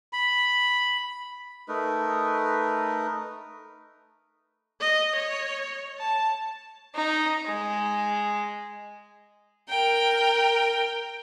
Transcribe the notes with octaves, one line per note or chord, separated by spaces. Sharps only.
B5
A3 D#4 A#4 B4
D#5
C#5
A5
D#4
G#3
A#4 G5